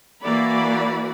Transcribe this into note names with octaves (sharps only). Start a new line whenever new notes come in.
E3 A#3 F#4 D5 B5